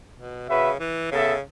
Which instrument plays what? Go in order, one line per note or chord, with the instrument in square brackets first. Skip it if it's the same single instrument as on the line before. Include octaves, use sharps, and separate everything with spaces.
[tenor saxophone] B2
[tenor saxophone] C#3 [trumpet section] F#4 B4 E5
[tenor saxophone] E3
[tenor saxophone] C#3 [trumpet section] B3 A4 E5